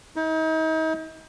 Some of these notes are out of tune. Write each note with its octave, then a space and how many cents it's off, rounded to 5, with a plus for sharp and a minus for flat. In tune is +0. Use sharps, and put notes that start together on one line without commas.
D#4 +40